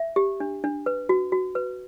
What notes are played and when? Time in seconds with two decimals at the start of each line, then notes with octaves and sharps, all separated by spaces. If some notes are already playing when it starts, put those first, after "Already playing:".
Already playing: E5
0.16 G4
0.40 D4
0.64 D4
0.86 B4
1.09 F#4
1.32 F#4
1.55 B4